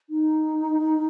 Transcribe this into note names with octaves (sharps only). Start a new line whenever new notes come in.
D#4